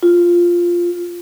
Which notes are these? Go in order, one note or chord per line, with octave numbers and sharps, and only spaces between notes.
F4